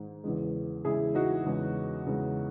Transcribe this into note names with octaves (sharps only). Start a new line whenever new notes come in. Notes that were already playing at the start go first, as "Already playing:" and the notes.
Already playing: G#2 D#3 G#3
E2 C#3 E3 G#3
E2 C#3 E3 G#3 E4 G#4
D#4 F#4
E2 C#3 G#3
E2 C#3 G#3